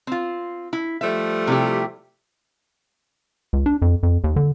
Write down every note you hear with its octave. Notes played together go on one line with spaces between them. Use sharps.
C4 F4
E4
F3 G3 A3 E5
C3 E4 G4
C#2
D4
F2
F2
D#2
D3